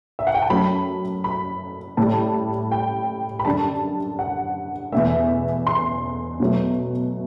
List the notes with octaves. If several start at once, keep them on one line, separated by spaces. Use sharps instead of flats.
E5
F#5
G5
A5
F#2 F#3 A3 B5
B5
A2 G3 A5
G5
B5
F#2 D3 G3 A5
F#5
E2 B2 A3 E5
C6
B2 F#3 A3